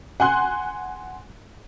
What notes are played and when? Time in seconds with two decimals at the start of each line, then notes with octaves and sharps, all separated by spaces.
0.20 F#5 G#5 C6 F#6